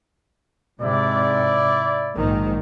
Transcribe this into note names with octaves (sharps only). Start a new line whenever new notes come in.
G#2 C3 E4 D5
A#1 G#2 D#3